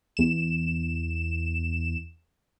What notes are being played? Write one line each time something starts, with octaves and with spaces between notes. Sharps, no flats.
E2 E7